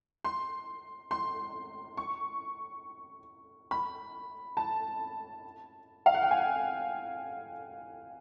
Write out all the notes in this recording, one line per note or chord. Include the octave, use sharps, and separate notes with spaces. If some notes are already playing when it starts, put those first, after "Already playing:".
C6
C6
C#6
B5
A5
F5
F#5
G5
G#5